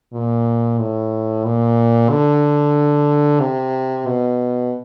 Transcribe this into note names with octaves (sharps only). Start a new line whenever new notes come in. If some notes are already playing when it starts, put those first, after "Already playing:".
A#2
A2
A#2
D3
C3
B2